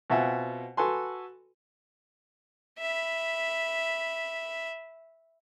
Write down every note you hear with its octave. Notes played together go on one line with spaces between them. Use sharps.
B2 C4 F4 E5 F#5 G#5
F#4 A4 B4 G#5 C6
E5 B5